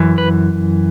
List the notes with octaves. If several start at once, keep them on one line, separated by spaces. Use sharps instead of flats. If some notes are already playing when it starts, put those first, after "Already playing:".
Already playing: F#2 E3
B4